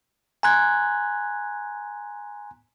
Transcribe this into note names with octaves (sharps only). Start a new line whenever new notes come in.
G#5 A#5 C6 F#6 G#6